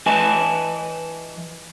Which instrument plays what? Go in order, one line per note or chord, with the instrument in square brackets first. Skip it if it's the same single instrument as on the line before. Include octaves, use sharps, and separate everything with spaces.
[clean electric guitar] E3 B4 D#5 G#5 A5